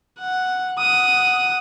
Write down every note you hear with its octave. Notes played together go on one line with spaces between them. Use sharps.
F#5
F#5 D#6